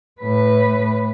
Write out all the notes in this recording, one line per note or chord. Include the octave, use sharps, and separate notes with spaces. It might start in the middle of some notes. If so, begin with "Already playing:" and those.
A2 B4